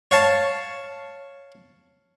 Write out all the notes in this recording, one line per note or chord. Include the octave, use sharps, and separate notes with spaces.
C#5 F5 A5